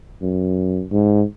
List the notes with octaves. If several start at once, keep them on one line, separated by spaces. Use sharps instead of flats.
F#2
G#2